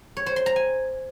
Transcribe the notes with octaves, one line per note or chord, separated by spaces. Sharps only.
C#5
C5
C6
A#5
G#5